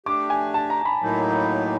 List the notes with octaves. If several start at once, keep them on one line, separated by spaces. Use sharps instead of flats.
A3 D4 G4 D6
G#5
A5
A#5
B5
A2 F#3 A#3 D#4